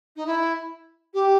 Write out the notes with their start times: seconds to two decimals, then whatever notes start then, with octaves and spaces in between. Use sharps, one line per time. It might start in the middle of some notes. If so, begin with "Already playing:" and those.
0.16 D#4
0.26 E4
1.14 G4